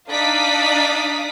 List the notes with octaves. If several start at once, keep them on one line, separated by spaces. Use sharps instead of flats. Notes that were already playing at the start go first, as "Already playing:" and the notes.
D4 D#4 D5 F5 D#6 B6